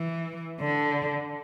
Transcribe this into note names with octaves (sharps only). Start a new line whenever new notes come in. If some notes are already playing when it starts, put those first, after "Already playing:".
Already playing: E3
D3